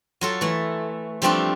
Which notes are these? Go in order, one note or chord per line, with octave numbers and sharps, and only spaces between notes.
F#3 F4 A4
E3 A3
F3 G3 A3 C4 D4 F4